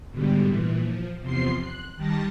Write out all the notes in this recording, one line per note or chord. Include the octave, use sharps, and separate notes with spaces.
G#2 B2 D3 G3
A#2 E3
F3
E2 C3 F3 C6 C7
F#6
D#3 G3 A5 A#6